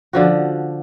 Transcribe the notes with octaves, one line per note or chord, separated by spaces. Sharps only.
D3 F3 F#4